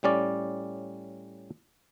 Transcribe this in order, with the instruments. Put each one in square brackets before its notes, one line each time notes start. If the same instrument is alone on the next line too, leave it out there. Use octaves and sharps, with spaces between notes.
[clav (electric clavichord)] A2 G3 C#4 D5